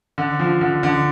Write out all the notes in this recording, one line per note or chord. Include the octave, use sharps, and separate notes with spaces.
D3
F3
D3
D3